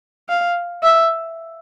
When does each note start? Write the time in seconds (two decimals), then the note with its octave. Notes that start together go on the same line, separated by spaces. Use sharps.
0.29 F5
0.83 E5